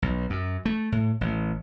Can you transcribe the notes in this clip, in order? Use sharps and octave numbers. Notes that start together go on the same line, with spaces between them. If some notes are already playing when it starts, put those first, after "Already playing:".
B1
F#2
A3
A2
A1